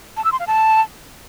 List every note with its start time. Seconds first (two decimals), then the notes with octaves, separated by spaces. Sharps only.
0.17 A5
0.25 E6
0.32 C6
0.40 F5
0.47 A5